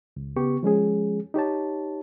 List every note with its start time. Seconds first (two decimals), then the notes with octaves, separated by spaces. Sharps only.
0.17 C#2
0.36 C#3 B3 G4 C#6
0.63 F3 G#3 C#4 G#4
1.34 D#4 G4 C#5 A5